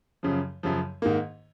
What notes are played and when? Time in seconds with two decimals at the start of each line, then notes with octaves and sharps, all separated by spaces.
0.23 F#2 C#3 F3
0.63 F#2 C#3 F3
1.02 G#2 D#3 A#3